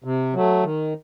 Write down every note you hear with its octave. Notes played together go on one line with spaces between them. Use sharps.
C3
F#3 A3
D#3